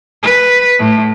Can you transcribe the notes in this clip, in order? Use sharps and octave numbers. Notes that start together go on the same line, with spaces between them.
B4
A2